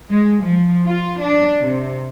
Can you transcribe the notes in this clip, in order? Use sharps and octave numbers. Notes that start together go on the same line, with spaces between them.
G#3
F3
F4
D4
C3